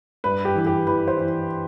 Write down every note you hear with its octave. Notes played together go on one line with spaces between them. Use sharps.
G2 B4
G4
E3
G4
E3 B4
C5
E3